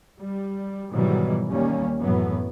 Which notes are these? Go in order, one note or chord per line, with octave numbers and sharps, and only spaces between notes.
G3
G#2 B2 D#3 E3 F#3 G3
D#2 G3 A#3 C#4
F#2 A2 E3 F#3 B3